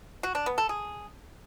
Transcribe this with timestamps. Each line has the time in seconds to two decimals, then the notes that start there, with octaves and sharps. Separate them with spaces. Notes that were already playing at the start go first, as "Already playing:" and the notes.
0.23 F#4
0.35 D4
0.46 B3
0.58 A4
0.69 G#4